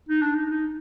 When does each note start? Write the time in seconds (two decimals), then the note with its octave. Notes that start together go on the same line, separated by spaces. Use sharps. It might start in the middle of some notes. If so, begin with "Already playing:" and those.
0.09 D#4
0.22 D4
0.35 D#4
0.50 D#4